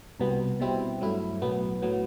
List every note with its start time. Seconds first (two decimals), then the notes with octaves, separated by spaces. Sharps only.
0.20 C2 B2 G3 B3
0.60 B2 G3 C4 E4
1.01 G2 F#3 A3 E4
1.41 B1 A2 F#3 B3
1.82 A2 F#3 B3